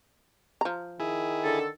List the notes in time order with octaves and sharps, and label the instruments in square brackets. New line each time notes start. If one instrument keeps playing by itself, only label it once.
[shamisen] F3 A#5
[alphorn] D#3 [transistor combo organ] E4 G#4
[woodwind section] D3 A4